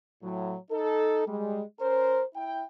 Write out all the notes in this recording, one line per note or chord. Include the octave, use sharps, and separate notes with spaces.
A2 F#3
D#4 A4
G3 G#3
C#4 A#4 C5
E4 G5